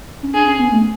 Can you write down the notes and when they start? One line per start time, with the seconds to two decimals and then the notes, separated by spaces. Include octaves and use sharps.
0.23 C#4
0.34 D4 G#4
0.47 C#4
0.59 B3
0.72 A3